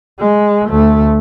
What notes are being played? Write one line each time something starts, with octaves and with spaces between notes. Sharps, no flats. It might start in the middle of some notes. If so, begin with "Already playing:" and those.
G#3
D2 A3